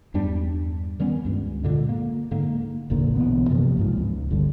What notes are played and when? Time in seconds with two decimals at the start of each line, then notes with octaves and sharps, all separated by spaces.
0.14 E2 G2 G3 D4
0.99 D#3 G3 B3 C#4
1.25 C#2 G2
1.63 A#2 D3 G#3
1.89 A#3
2.31 G#2 D3 A#3
2.90 F1 A#1 A#2 D3
3.16 B1 G2 E3 B3
3.50 G2 C3 F3 A#3
3.77 C2 G#2 F3
3.97 C#2
4.31 G1 D3 G3